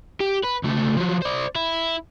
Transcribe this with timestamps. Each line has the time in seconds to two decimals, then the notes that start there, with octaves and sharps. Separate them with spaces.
0.20 G4
0.43 B4
0.63 C#2 A3
0.97 F3 F#3
1.22 C5 D5
1.55 E4